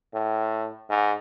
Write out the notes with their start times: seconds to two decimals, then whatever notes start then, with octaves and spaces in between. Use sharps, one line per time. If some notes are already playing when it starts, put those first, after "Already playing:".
0.14 A2
0.90 G#2